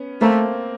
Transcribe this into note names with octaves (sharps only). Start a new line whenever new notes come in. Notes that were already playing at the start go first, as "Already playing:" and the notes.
Already playing: B3 C#4
A3 A#3 C4